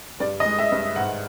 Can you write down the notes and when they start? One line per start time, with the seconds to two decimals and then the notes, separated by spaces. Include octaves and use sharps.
0.20 G2 D5
0.40 D#5
0.46 G#3
0.59 E5
0.72 G2
0.96 G#2 F#5